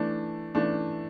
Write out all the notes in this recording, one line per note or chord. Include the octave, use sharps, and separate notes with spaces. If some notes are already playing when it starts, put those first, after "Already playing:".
Already playing: E3 A3 D4
E3 A3 D4